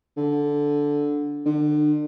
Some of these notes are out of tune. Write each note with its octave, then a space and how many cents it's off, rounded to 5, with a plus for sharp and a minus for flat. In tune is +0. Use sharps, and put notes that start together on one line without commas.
D3 -10
D3 +35